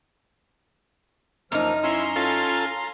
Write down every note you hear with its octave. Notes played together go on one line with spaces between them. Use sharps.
F#2 F3 A#3 D#4 F6
C#4 E4 A#5 C6
C#4 F4 A4